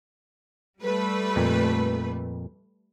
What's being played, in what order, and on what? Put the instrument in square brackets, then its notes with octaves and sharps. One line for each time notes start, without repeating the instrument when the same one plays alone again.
[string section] G3 A3 B4
[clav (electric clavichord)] F2 A#2